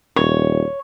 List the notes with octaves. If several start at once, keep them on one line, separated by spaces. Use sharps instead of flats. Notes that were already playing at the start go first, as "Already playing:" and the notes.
D#1 C#5